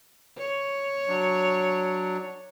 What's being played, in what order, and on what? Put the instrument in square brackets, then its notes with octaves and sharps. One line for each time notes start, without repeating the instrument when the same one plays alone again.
[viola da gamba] C#5
[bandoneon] F#3 D4